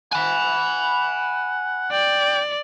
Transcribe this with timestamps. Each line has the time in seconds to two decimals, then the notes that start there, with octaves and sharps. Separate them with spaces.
0.13 F#5 G#5 B5
1.92 D5 G5